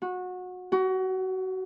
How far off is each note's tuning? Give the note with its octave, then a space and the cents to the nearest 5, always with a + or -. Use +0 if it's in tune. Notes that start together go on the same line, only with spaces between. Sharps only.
F#4 -25
F#4 +25